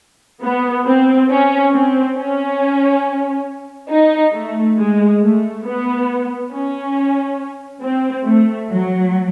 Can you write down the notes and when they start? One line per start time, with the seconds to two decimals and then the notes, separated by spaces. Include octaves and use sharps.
0.43 B3
0.86 C4
1.30 C#4
1.73 C4
2.17 C#4
3.90 D#4
4.33 A3
4.78 G#3
5.22 A3
5.65 B3
6.52 C#4
7.82 C4
8.26 A3
8.69 F#3